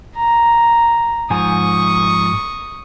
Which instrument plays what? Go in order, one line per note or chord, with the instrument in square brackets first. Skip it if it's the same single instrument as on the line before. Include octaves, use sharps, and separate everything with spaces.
[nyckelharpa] A#5
[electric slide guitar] G#2 F3 G#5 [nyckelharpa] C#6 D#6